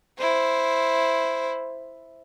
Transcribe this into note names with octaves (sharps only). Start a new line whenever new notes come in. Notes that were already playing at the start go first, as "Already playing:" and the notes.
E4 C5